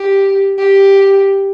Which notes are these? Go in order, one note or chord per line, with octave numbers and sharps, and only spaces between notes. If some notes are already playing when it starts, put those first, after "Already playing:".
Already playing: G4
G4